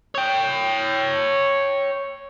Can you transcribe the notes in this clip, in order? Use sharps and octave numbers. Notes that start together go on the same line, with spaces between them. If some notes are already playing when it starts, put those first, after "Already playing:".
C#5 G5